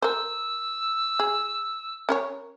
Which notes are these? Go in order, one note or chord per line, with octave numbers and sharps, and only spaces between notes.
A#4 C5 E6
G#4
C#4 A#4 C#5